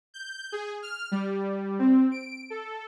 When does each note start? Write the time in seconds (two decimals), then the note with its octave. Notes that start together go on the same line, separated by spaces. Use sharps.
0.14 G6
0.52 G#4
0.82 F6
1.11 G3
1.79 C4
2.11 D7
2.50 A4